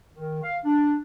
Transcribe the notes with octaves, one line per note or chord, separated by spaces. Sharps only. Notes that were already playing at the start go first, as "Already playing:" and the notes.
D#3
F5
D4